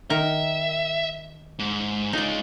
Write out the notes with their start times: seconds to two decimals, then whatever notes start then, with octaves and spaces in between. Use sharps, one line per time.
0.10 D#3 A#4 E5
1.59 G#2
2.13 G#3 D#4 F4 D5